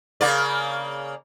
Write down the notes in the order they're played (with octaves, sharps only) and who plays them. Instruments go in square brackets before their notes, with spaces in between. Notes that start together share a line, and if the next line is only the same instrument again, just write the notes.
[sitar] C#3 A#3 D5